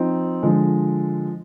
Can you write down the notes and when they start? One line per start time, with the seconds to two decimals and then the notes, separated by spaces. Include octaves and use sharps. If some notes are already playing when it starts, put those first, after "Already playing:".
Already playing: F3 C4 D#4
0.42 D3 F3 G#3